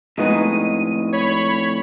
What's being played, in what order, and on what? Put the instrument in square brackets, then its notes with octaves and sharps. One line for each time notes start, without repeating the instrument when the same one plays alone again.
[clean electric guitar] F2 A2 [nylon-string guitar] G#3 B3 D#4 [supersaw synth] D#7
[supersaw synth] C#5 B5